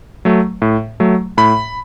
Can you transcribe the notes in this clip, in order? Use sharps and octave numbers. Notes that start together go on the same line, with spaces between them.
F#3 A3
A2
F#3 A3
A2 B5